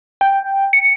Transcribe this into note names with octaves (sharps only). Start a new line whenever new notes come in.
G5
C#7